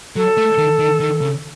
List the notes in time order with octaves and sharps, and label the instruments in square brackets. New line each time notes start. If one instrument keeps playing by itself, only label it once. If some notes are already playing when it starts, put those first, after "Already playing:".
[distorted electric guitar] F#3 [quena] A4
[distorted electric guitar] A3
D#3
D#3
D#3
C#3